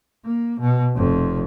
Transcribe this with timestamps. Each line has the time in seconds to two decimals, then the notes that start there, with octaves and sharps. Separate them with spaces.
0.25 A#3
0.60 B2
0.96 F1 F2